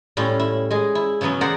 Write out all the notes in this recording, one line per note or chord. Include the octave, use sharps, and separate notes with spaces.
A2 G3 C#4 F4
E4
G#3 G#4 D#5
E4
C#3 E3 F#3 B3 C#4
G#4 A#4 C5 D5 F#5